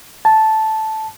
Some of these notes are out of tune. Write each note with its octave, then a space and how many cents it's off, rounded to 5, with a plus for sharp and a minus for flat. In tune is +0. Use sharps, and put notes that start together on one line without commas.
A5 -5